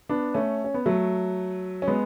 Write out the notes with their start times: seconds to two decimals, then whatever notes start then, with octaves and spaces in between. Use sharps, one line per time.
0.09 B3 D4
0.34 A3 C#4
0.64 C#4
0.74 B3
0.86 F#3 A3
1.82 C#4
1.87 G#3 B3